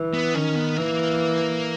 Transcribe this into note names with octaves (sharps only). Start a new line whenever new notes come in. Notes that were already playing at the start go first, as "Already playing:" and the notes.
Already playing: E3
B3
D#3 C#4
B3
E3 A#3